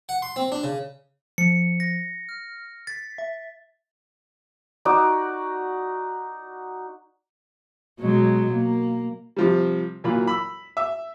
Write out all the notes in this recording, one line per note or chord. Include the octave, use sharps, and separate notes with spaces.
F#5
C6
C4
D4
C#3
F3 C#7
A#6
F6
A6 B6
E5
D#4 F#4 D5
B2 F#3 G#3
A#3
C3 F3 G3
A#2 E3 F#3 F4 B5
B5 E6
E5